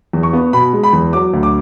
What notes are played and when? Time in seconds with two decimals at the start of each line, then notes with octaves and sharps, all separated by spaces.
0.13 E2
0.23 C#6
0.33 B3
0.53 B2 B5
0.73 G#3
0.83 B5
0.93 E2
1.13 F#3 D6
1.33 D2
1.43 D6